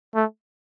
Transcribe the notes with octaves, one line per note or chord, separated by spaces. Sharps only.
A3